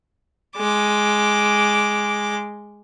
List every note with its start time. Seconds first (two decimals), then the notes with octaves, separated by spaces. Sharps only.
0.57 G#3 D6